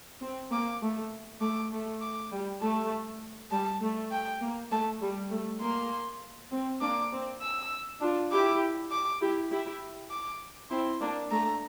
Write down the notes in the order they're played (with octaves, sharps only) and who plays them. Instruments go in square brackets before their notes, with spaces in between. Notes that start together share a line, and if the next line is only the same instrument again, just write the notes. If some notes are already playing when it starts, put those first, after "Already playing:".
[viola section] C4
[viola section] A#3 [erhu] D6
[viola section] A3
[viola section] A3 [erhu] D6
[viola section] A3
[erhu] D6
[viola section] G3
[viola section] A3 [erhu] A5
[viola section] G3 [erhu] A5
[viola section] A3
[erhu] G5
[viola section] A#3
[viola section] A3 [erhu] A5
[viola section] G3
A3
[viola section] A#3 [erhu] C6
[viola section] C4
[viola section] A#3 D4 [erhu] D6
[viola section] C4
[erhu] E6
[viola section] D4 F4
[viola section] E4 G4 [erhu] D6
[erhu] D6
[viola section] E4 G4
E4 G4
[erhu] D6
[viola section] C4 E4 [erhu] C6
[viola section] A#3 D4
[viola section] A3 [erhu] A#5